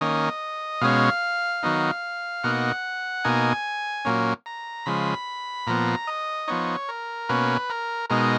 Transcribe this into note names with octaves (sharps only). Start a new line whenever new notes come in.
D#3 A#3 C#4 D#5
B2 G#3 C#4 F5
D#3 F#3 B3 D#4
B2 A#3 D#4 F#5
B2 A#3 D#4 G#5
A#2 F#3 A#3 C#4
A#5
C#3 F3 G#3 B5
A#2 F3 B3 A#5
D#5
F3 B3 D#4 C#5
A#4
B2 A#3 C#4 B4
A#4
B2 G#3 D#4 A#4